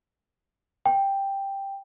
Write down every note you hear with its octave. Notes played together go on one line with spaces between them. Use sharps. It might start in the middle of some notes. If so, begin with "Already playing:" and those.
G5